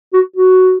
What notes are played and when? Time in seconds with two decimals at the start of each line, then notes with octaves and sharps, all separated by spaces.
0.13 F#4
0.36 F#4